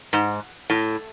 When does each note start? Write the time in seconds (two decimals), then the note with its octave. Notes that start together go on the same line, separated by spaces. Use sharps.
0.13 G#2
0.70 A2